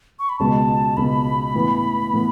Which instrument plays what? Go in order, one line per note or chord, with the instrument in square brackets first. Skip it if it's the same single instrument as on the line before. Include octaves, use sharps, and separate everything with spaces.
[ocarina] C#6
B5
[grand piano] C#2 B2 G#3 [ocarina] A5
[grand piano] C#2 B2 G#3 [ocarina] B5
[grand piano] A2 E3 B3
A2 E3 B3